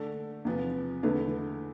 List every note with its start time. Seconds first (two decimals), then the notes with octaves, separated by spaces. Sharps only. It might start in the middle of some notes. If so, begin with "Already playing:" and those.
Already playing: D3 A3 D4 A4
0.45 E2 C3 F3 B3
1.03 E2 D3 A3 E4 B4